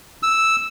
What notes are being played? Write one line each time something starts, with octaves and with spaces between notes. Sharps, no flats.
E6